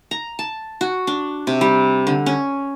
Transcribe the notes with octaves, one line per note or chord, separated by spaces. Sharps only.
A#5
A5
F#4
D4
C3
G3
D3
C#4